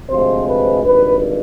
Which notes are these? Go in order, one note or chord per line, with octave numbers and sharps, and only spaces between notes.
D2 C3 F3 G#3 C5
B4
G#1 G2 D#3 B4